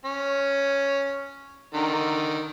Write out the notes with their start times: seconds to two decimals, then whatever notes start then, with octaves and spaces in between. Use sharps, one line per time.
0.05 C#4
1.74 D3 D#3